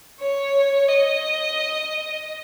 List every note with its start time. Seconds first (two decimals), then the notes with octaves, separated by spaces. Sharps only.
0.20 C#5
0.89 D#5